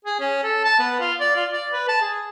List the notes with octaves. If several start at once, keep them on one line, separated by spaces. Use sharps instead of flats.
G#4
C#4
A4
A5
B3
F4
D5
F4
D5
B4
A5
G#4